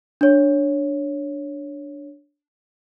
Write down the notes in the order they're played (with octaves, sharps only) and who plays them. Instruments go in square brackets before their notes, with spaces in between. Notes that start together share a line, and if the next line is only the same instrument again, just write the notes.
[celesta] D4 C#5